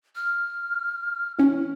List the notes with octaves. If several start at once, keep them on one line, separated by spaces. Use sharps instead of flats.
F6
E3 C#4 E4